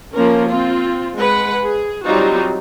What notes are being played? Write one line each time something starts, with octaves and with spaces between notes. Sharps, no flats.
F3 A#3 C#4 A#4
C4 F4
G#3 B4 F#5
G#4
F#3 G3 C4 D#4 F4 F#4